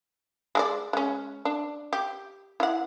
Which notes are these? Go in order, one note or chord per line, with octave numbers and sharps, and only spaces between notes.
G#3 A4 D5
G#3 C#4
D4
G4
E4 F#5